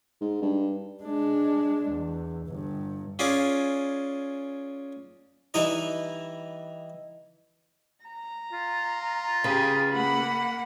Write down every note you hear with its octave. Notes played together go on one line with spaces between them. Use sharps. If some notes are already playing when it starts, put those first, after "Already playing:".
G#2
G2
G#3 D4
E2
G1 G2
C#4 F4 G#4 D5
E3 G3 D#4 E4 D#5
A#5
F4
C#3 G4 G#4 B4
A#3 F#5 B5